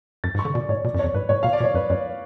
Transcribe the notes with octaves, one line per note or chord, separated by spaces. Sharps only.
F#2 A6
G#2
C#6
D3
B2 D5
A2 C#5
B2 D5
F#2
F2 C#5
G#2 B4
A2 C#5
B2 F5
D5
B2
C#5
F#2 B4
F#2 C#5